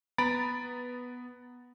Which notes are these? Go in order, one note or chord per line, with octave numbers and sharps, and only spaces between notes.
B3 A#5 B5 A6 D7